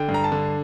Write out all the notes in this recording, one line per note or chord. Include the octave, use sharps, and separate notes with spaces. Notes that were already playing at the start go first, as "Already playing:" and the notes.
Already playing: D3 G5
G2
A#5
A5
D3